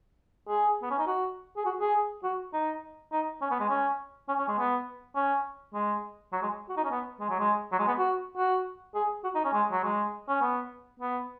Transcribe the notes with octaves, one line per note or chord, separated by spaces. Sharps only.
G#4
B3
C#4
D#4
F#4
G#4
F#4
G#4
F#4
D#4
D#4
C#4
B3
G#3
C#4
C#4
C#4
G#3
B3
C#4
G#3
F#3
G#3
F#4
D#4
C#4
B3
G#3
F#3
G#3
F#3
G#3
B3
F#4
F#4
G#4
F#4
D#4
C#4
G#3
F#3
G#3
C#4
B3
B3